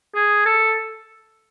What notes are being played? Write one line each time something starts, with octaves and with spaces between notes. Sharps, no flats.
G#4
A4